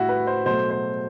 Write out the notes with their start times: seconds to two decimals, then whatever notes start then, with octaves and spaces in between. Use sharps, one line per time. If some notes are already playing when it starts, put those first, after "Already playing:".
Already playing: A2 G3 E4 F#4
0.09 B4
0.27 C5
0.46 B2 F#3 A3 C5
0.70 C5